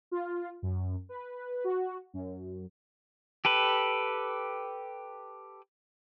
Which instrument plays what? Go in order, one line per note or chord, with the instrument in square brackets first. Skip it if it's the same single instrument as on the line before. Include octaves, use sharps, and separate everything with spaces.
[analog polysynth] F4
F#2
B4
F#4
F#2
[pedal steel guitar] G4 A4 B4